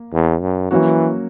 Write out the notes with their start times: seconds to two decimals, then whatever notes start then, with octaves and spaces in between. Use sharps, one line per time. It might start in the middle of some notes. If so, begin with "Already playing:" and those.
Already playing: A#3
0.12 E2
0.41 F#2
0.71 E3 F#3 A#3 C#4 F#4